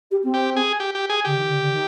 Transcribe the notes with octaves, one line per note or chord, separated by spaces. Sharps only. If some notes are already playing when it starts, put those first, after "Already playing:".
G4
C4
G4
G#4
G4
G4
G#4
D3 G4
D#3
D3
D3
D#3